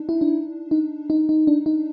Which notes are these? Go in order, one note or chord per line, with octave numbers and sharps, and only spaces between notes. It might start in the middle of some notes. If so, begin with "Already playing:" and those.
Already playing: D4 D#4
E4
D4
D#4
D#4
D#4
D4
D#4